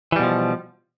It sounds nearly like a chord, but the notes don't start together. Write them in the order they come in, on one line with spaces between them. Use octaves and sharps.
E3 G3 B2 F3